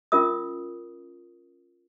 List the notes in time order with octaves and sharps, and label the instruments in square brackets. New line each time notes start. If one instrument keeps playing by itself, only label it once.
[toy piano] C#4 F4 A#4 E5 D#6